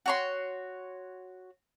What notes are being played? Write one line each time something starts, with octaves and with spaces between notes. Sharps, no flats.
F#4 C#5 C6